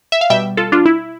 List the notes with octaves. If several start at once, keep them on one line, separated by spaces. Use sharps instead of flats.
E5
F5
B2 G3 E5 G5
F4 A4
D4 F4
E4